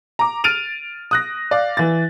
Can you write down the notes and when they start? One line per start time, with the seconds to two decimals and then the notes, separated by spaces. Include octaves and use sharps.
0.19 A#5 D6
0.44 F6 A6 D7 D#7 F7
1.11 D#6 F#6 A#6
1.51 D5 F5
1.77 E3 A6